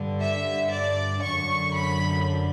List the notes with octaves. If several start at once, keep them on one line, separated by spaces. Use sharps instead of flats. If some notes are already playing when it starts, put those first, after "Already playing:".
Already playing: G2 D3
E5
D5
F#2 D3 C#6
B5